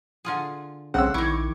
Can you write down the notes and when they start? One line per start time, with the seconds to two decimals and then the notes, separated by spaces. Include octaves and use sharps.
0.25 D3 F4 G#4
0.94 B1 C#3 C4 F#5 E6
1.14 A#1 D#3 E4 C#6 D6 G#6